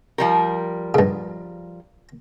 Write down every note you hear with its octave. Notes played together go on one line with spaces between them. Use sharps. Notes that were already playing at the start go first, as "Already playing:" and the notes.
F3 G3 A#4
G2 C#3